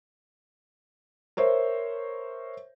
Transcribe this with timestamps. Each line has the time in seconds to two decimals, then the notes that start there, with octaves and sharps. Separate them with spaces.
1.37 A#4 C5 C#5 E5